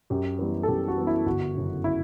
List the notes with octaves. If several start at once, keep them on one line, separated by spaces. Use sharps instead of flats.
F#2 G4
E3 G3 B3
A4
F#2 G4
F#4
E3 G3 B3
E4
G1 F#4
F#2 C#3
E4